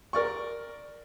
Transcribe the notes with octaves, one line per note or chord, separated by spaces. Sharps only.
A#4 D5 C#6